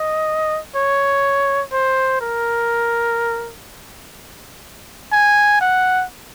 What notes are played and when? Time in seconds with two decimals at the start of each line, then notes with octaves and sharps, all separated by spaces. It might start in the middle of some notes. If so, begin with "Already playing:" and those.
Already playing: D#5
0.75 C#5
1.72 C5
2.21 A#4
5.12 G#5
5.61 F#5